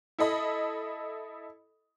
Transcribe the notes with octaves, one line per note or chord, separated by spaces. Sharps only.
E4 A4 D#5 B5